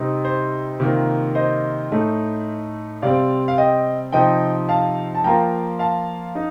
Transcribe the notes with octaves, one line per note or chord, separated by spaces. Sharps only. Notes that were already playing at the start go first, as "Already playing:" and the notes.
Already playing: C3 G3 C4 D#4
C5
C3 D#3 A#3 F4
C5 D#5
A2 A3 D#4
C3 G3 C4 D5 F5
F5
D#5 G5
C3 F3 C4 D#4 D#5 G5
F5 A5
A5
F3 A#3 F4 G5 A#5
F5 A5
D#4